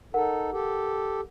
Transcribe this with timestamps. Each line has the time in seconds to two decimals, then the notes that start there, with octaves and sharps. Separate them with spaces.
0.14 D#4 A4 A#4 F#5
0.52 G4 A4